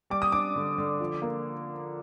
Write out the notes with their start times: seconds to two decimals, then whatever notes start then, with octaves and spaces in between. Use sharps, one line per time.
0.10 G3 D6
0.22 D#6
0.32 D4 D6
0.56 D3
0.78 D3
1.00 F3
1.22 A#3